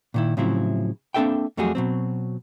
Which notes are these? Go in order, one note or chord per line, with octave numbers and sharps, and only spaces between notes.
A#2 D#3 E4
A2 C#3 F3 F#3 C4 E4
A#3 C4 D4 A4 E5 G5
F2 F#3 G3 A3 F#4 G#4
B2 F#3 C4